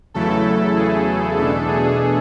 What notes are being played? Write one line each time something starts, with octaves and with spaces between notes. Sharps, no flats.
E2 C#3 F#3 A3 E4 A4
G#4
E2 B2 A3 D4 A4
G#4